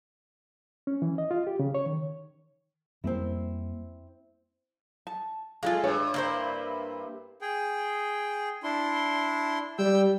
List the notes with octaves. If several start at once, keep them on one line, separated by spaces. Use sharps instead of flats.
C#4
E3
D#5
F4
G4
C#3
C#5
D#3
F2 G3 A#3 C4 E4
A5
G#3 A3 F4 G#4 A4 F5
G2 C#5
A#3 E4 C5
G#4 G5
D4 E4 C6
G3 G5 E6 G6